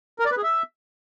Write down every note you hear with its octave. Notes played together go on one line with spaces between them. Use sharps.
A#4
D5
B4
G#4
E5